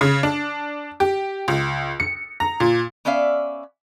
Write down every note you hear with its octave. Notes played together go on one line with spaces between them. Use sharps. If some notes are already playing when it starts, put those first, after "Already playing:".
C#3
D4
G4
C#2
C#7
A#5
A#2
B3 C#4 D5 E5 F5